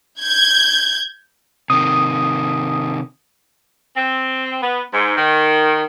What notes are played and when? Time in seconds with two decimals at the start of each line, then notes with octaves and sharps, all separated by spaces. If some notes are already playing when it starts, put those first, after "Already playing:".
0.21 G6 G#6
1.70 C3 D#3 D#6
3.97 C4
4.62 B3
4.94 G#2
5.17 D#3